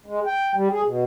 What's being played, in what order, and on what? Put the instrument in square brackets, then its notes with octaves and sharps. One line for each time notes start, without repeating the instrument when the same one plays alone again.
[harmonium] G#3
G5
G3
G#4
B2